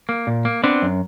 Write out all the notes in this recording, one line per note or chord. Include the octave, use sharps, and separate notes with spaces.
A#3
A#2
A#3
B3 C4 D4
F#2